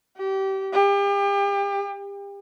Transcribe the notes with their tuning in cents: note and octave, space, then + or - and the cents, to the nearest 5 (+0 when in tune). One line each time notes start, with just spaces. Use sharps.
G4 -25
G4 +35